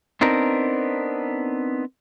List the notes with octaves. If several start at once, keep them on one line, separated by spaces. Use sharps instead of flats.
B3 C4 D4 D#4 A#4